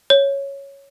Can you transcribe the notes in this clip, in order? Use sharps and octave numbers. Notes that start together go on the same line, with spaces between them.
C#5